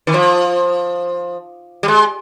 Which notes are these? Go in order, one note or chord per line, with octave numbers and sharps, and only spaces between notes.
D#3
F3
G3
G#3